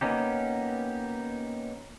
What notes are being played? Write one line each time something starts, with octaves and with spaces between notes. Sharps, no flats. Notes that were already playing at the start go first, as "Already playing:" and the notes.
A#3 B3 C#4 D#4 G4